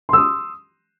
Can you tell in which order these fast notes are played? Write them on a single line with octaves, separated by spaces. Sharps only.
C6 E6 D#6